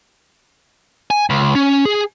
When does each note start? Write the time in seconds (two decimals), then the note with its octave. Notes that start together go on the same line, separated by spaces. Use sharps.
1.11 G#5
1.30 C#2
1.55 C#4
1.85 G#4